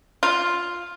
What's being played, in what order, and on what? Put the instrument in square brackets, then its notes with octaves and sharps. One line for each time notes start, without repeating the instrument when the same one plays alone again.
[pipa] F4